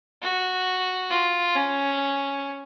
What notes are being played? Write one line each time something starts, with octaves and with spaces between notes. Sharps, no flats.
F#4
F4
C#4